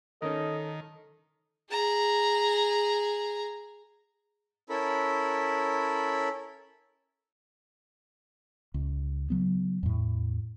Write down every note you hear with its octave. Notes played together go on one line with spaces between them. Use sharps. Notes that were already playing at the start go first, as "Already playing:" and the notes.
D#3 C#4 D#4 A4 A#4 D#5
G#4 A#5
C#4 E4 A4 A#4 B5
C#2
C#3 F#3 B3
E2 A2